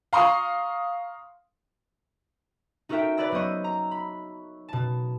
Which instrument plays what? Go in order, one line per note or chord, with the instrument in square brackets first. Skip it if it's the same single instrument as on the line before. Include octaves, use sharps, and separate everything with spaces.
[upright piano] F5 A#5 C6 C#6 D#6
[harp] D#4 F#4 A4 A#4 E5 G5
B4 C#5 D5 B5 E6 A#6
F#3 B3 C5 D#5 C#6
A#5
B5
B2 A5